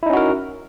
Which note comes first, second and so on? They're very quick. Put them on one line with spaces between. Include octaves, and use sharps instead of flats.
E4 D#4 C#4 F#4 A#4